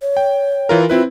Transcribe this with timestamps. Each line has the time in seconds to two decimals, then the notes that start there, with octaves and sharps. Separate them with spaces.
0.02 C#5
0.17 G5
0.69 E3 F4 A#4
0.90 C4 E4 F4 B4